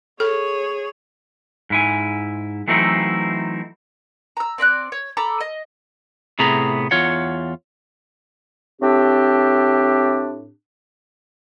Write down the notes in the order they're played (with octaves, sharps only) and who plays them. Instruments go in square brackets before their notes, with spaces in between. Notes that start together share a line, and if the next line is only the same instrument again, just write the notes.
[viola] G#4 C#5 [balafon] A4
[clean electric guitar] G#2 E4 G#5
E3 F#3 A3 C4 D#4 E4
[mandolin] A#5 E6
C4 D5 B5 F#6
C#5
A4 A#5 B5 D6
D#5
[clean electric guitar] A2 C3 B3 G#4 A#5 B5
E2 F4 C#5 F#5
[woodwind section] A2 C4 D4 G4